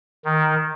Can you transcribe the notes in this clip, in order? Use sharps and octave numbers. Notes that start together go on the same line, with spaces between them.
D#3